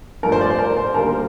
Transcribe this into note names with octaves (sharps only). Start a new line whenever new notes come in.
G2 F3 A3 A#4
C5
D5
C5
A#4
C5
D2 D3 G3 A#3 A#4